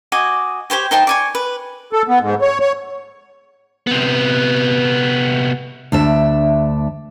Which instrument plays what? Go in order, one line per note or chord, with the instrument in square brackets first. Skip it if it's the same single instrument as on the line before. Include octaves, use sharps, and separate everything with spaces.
[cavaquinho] F#4 D#5 G#5 D6
G4 C5 C#5 G5
D#4 C5 G5 A5
D5 G#5 C#6
B4
[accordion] A4
B3
G#2
C#5
C#5
[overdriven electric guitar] C3 B3
[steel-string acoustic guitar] D2 D4 E5